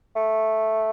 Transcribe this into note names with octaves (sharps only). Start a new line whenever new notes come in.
A3